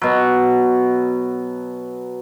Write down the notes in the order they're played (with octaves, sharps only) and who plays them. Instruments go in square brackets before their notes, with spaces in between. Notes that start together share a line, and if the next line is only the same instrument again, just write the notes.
[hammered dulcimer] B2 F#3